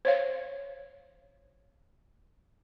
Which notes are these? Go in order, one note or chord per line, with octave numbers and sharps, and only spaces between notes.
C5 C#5 F5